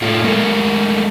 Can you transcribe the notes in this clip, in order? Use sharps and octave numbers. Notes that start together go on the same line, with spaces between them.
A2 A3 F4
G#3 A3 A4 A#4